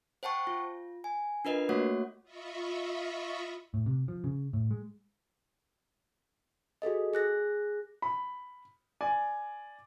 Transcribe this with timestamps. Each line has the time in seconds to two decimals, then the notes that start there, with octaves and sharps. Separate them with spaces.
0.23 C5 F#5 G5 A5 C#6
0.47 F4
1.04 G#5
1.45 D4 F4 A#4 B4 D#5 C7
1.69 A3 A#3 F#4 C#5 F#5
2.23 F4 D#5 E5 B5 C#6
3.74 A2
3.86 C3
4.08 F3
4.24 C#3
4.53 A2
4.71 G#3
6.82 F#4 G#4 A4 D#5
7.14 G#4 F#6 A#6
8.02 B5
9.01 D5 G#5